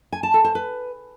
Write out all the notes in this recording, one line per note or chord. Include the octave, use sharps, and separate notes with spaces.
G#5
A5
A4
C5
B4